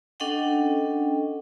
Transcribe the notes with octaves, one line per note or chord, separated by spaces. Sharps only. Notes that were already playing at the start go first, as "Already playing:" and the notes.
C#4 D4 A4 D#5 F#5 G5